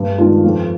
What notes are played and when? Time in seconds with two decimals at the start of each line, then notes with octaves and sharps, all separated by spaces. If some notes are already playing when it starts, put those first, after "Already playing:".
Already playing: G2
0.18 D#3 G#3 D4 F4
0.44 F2